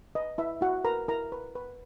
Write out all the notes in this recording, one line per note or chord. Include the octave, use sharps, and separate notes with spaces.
B4 D#5
E4 B4 E5
E4 F#4 F#5
A#4 B4 A#5
E4 A#4 A#5
B4
B4